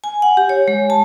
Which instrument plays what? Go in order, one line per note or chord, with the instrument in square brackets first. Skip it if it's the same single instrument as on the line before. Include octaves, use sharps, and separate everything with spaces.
[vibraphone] G#5
F#5
G4
C#5
G#3
A5